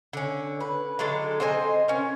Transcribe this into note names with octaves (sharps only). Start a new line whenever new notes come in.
D3 C#4
B4
D3 F#3 G#3 A4
C4 C5 D#5 G#5
C#4 A#4